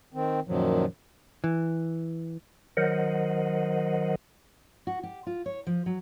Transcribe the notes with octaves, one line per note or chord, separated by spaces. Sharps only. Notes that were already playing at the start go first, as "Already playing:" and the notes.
D#3 C4
F#2 A#2 D#3 F3 F#3
E3
D#3 F#3 A#4 C5 D#5 F#5
F#4
G4
F4
C#5
F3
F#3